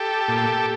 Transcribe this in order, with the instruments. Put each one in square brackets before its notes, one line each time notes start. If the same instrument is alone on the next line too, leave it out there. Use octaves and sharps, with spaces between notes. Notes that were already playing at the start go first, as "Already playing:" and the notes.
Already playing: [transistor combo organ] G4 A4
A#2